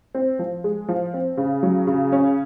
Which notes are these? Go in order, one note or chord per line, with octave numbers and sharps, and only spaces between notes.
C4
F3
G#3
F3
C4
C#3
F#3
C#3
C#4